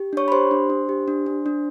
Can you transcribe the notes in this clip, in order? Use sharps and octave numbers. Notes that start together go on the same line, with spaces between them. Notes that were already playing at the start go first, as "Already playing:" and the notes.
Already playing: G4
D4 C#5 C#6
B5
G4 C5 C6
D4
D4
G4
D4
D4
D4